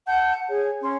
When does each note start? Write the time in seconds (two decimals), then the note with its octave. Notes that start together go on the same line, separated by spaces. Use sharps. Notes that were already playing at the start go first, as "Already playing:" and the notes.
0.07 F#5 A5 G6
0.49 G#4 C#5
0.82 C#4 C6